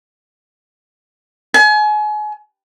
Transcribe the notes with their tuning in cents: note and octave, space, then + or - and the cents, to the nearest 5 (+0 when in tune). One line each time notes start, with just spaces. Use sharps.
G#5 +35